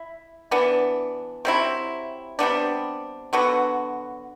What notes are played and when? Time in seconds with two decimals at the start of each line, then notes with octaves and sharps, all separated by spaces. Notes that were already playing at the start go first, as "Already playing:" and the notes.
Already playing: E4
0.51 E3 B3 D4
1.45 C3 F#3 C4 E4
2.39 C3 G3 B3 D4
3.33 D3 F#3 B3 F#4